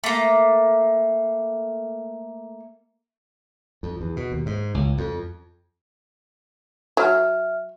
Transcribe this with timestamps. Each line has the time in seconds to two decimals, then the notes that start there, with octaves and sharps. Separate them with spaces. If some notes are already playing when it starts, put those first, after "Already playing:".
0.04 A3 A#3
3.83 F2
4.01 E2
4.16 B2
4.32 D#2
4.46 G#2
4.74 C#2
4.98 F2
6.97 F#3 E5 F6